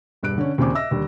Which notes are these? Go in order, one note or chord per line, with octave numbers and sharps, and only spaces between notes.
E1 G2 F#6 D7
D3 C#4
D#2 A#2 C#3 C4 G#5 D6
D#5 E5 E6 A#6
D#2 D3 G3